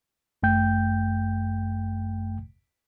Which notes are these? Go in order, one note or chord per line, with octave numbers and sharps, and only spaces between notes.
G1 F#2 A3 G5 G6